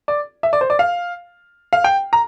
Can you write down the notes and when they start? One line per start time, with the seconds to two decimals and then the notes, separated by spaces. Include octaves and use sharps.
0.08 D5
0.43 E5
0.53 D5
0.61 C5
0.70 D5
0.79 F5
1.73 F5
1.84 G5
2.13 A#5